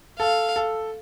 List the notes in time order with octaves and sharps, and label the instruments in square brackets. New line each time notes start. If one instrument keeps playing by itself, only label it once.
[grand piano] A4 [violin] F5
[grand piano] A4